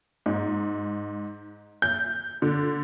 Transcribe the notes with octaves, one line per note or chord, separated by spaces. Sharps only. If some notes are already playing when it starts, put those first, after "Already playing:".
G#2
G6
D3